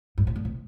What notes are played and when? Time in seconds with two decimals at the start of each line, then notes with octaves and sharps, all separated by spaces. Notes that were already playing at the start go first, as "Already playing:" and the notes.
0.18 G2
0.27 C3
0.36 D3
0.45 C3